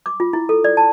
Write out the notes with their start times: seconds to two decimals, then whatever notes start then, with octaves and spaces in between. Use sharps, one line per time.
0.06 D6
0.20 F4
0.33 E4
0.49 A4
0.64 D5
0.77 A5